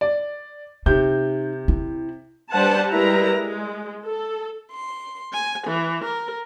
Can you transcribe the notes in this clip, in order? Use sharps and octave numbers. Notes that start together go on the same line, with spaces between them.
D5
C3 D#4 G6
E4
G3 D4 B4 C5 F#5 A5
G3 G#3 E4 A#4 B4 A#5
G#3
A4
C6
G#5
E3
A#4